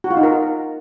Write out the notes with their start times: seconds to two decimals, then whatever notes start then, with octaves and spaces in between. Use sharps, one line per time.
0.04 F#4
0.11 F4
0.17 D#4
0.23 A#4